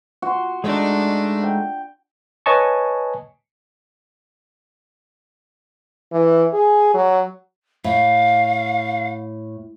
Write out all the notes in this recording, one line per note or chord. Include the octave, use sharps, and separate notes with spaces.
F#4 C6
G#3 A3 D4 D#4
G5
B4 C#5 D#5 G#5 A5 C#6
E3
G#4
F#3
A2 F5